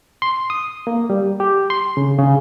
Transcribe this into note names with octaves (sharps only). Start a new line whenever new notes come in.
C6
D#6
A#3
G3
G4
C6
C#3
C#3